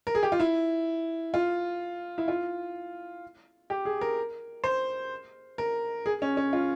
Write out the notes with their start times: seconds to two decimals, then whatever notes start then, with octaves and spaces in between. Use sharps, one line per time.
0.07 A#4
0.15 G#4
0.23 G4
0.32 F4
0.40 E4
1.34 F4
2.18 E4
2.28 F4
3.70 G4
3.85 G#4
4.01 A#4
4.64 C5
5.58 A#4
6.06 G#4
6.22 C#4
6.37 C#4
6.53 F4